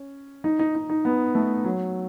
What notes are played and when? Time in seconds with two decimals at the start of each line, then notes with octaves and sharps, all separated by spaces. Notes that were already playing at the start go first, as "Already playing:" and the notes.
Already playing: C#4
0.44 D#4
0.59 D#4
0.75 D#4
0.90 D#4
1.05 B3
1.35 A3
1.64 F#3